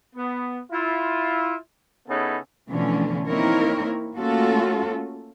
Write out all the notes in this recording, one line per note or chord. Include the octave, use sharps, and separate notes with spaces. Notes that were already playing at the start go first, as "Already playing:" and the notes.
B3
E4 F4
C#3 B3 C#4 D#4 E4 A4
B2 D3 E3 F3 A3 C#4
A#3 C4 D#4 E4 A#4 C#5
A3 A#3 C#4 F4 F#4 A4